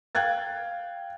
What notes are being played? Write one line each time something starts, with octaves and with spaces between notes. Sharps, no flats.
F5 G5 F#6 G#6 A6